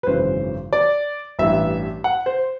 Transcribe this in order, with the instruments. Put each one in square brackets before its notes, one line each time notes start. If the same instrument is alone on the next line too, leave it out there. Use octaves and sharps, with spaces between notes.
[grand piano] B4
G#1 F#2 C#3 E3 C5
D5
A1 G2 E3 E5
F#5
C5